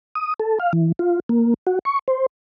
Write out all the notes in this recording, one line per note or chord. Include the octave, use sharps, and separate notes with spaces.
D#6
A4
F5
E3
F4
A#3
F#4
C#6
C5